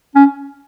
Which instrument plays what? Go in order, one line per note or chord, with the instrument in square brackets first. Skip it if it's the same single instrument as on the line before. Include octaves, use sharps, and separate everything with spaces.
[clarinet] C#4